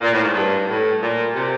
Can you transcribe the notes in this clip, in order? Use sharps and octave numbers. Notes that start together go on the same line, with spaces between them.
A#2
A2
G#2
G2
A2
A#2
C3